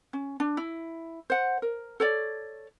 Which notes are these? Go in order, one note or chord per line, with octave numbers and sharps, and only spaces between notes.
C#4
D4
E4
C5 F#5
A#4
A4 C#5 D5